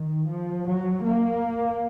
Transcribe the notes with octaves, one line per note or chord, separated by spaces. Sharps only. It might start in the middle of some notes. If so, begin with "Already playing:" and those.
Already playing: D#3
F3
F#3
A#3